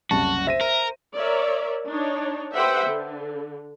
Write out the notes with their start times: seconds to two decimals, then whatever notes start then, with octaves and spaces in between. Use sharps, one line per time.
0.11 F#1 C2 C#3 F#4 A5
0.47 C5 E5 A#6 D#7
0.61 A#4
1.16 A#4 C#5 D5 E5
1.87 D4 D#4 C#5
2.55 G4 B4 C5 E5 F#5 G5
2.84 D3